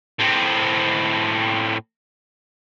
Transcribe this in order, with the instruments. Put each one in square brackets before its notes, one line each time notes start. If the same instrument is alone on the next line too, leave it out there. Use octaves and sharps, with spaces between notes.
[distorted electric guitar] A2 C4